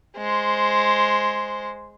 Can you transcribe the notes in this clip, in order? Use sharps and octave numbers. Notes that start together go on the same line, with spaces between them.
G#3 C5